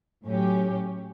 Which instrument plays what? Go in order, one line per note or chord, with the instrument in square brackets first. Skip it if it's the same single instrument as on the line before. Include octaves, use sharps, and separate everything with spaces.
[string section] A2 F#3 C#4 G4